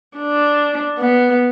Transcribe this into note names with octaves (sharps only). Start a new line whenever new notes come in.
D4
B3